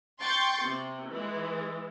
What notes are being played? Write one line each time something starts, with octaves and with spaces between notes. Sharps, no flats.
G5 C6 C#6 G6 A6
C3
E3 G#3